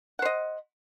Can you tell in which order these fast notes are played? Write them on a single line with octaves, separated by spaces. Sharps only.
F#5 C5 D#5